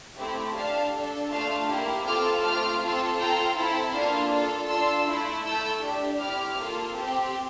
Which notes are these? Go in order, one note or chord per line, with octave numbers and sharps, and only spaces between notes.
A3 C4 E4 G4
D4 G4 F5 A5
D4 A4
A3 D4 F4 F5 A5
A#3 E4 G4
C4 F4 A4 D6 F6
A3 C4 F4 D6 F6
C4 F4 A4
C4 F4 A4 G5 A#5
C4 E4 A4
A#3 D4 F4 A4 F5 A5
D4 F4 A4
D4 F4 A4 C6 E6
A3 E4 A4
A3 E4 A4 E6 G6
D4 G4
C4 E4 G4 D6 F6
A#3 F4 A4
C4 G4